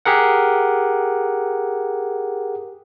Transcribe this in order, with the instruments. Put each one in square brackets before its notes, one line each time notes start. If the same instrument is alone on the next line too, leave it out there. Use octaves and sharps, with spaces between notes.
[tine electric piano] G4 G#4 A#4 F#5